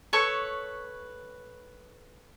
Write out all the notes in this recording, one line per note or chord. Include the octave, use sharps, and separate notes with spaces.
A4 B4 C#5 C#6